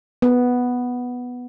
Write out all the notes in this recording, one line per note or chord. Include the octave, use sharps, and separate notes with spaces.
B3